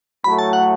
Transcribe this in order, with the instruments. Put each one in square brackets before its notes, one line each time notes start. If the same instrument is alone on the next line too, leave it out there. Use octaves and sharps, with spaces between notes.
[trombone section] A2 F#3 A3 [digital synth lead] B5
[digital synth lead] A5
F#5